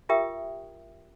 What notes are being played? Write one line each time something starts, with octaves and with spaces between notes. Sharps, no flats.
F4 G4 A#4 E5 G5 D#6